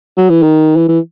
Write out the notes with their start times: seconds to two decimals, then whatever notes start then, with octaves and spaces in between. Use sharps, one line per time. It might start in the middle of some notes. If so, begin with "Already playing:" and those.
0.17 F#3
0.30 E3
0.43 D#3
0.76 E3
0.89 E3